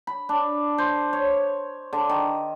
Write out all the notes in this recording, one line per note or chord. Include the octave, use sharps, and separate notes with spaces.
B5
D4
C5
C#5
D3
D#3